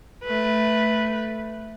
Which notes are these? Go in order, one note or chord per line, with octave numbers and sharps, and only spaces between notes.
A3 B4